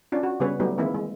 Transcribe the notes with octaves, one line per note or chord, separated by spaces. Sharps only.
C#4 D4 F4
F#4
C#3 G3 B3 G#4 B4 C#5
F#3 G3 A3 B3 D#4 G4
D#3 E3 G#3 A#3 C4 E4
G#3